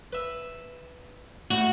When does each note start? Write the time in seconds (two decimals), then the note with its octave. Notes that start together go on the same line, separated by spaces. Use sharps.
0.13 B4 E5
1.51 A2 F#4